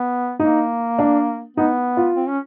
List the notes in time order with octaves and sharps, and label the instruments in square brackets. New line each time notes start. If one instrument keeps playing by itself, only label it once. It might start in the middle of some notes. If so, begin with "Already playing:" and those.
Already playing: [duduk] B3
[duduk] A#3 [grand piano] D#4
[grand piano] D4
[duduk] B3 [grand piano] D#4
[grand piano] F4
[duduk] C4
C#4